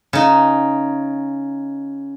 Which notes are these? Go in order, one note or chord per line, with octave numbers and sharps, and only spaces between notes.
C#3 D#4